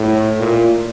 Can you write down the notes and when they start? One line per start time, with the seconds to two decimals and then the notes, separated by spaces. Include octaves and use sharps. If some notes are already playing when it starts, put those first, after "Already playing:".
Already playing: A2
0.39 A#2